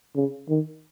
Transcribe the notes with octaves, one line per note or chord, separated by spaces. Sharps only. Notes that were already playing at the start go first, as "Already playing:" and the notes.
C#3
D#3